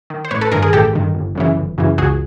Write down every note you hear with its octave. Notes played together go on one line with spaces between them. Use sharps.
D#3
C5
A1 B4 C#5
A4 B4
G2 D#3 G#4 A#4
G#4 A#4
A1 G4 A4
G2 D#3
G1
F#2 C#3 E3
G1
F#2 C#3 E3
C#2 F#4 G#4